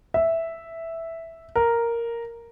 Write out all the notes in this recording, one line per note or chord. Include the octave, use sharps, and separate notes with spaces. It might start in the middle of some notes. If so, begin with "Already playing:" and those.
E5
A#4